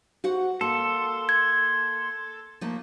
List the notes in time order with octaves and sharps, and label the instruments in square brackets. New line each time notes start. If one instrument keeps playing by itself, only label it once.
[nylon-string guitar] F#4 C5 F#5
[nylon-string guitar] A#3 [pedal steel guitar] A4 [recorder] C6
[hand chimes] G#6
[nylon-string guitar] F3 A3 A#3